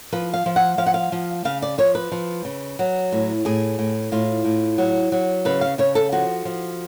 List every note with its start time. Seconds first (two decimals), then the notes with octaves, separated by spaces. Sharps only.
0.12 F3 B4
0.34 F5
0.46 F3
0.56 F#5
0.78 F3 F5
0.86 F#5
0.94 F5
1.12 F3
1.45 C#3 F5
1.62 D5
1.78 F3 C#5
1.95 B4
2.12 F3
2.45 C#3
2.79 F#3
3.12 A2
3.45 A2 G#4
3.79 A2
4.12 A2 F4
4.45 A2
4.78 F#3
5.12 F#3
5.45 C#3 B4
5.61 F5
5.78 C#3 C#5
5.95 A4
6.12 F3 F#4
6.45 F3